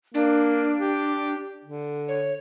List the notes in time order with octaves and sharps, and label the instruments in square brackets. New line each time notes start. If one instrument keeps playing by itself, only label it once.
[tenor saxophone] A#3 [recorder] D4
[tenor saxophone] G4
D3
[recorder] C#5